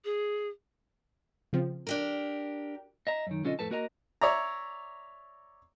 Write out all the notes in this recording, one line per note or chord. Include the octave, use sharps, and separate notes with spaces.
G#4
C#3 F3 C4
D4 G4 A#4
D#5 E5 A#5
F#2 D#3
B1 D3 C#4 F4 A4 D#5
F2 A2 A4 B4 A5
A#3 F#4 A#4 D#5 E5 A#5
C#5 D5 E5 A#5